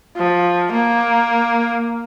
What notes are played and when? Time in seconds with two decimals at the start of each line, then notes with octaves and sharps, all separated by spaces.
0.17 F3
0.72 A#3